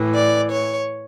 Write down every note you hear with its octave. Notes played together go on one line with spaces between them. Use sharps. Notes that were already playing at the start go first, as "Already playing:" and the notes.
Already playing: A2 E3
D5
C#5